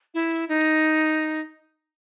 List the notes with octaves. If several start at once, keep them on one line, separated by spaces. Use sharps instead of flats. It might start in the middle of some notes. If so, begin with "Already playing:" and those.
E4
D#4